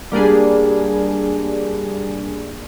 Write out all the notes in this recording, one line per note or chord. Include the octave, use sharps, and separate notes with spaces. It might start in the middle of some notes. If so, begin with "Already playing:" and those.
G3 A#3 D4 G#4